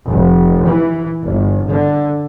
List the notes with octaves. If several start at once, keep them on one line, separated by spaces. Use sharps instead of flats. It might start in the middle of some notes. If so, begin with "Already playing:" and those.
F1
E3
G1
D3